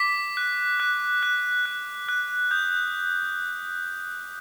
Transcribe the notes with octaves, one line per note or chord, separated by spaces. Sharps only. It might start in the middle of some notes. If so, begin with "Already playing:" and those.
Already playing: D6 B6
F#6
F#6
F#6
F#6
F#6
D#6 G6